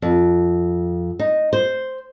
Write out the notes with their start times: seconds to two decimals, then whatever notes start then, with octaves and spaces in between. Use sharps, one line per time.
0.02 F2
1.19 D#4
1.53 C5